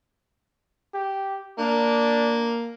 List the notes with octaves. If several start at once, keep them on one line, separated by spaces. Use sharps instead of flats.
G4
A#3 D4